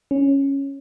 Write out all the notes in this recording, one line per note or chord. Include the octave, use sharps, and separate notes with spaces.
C#4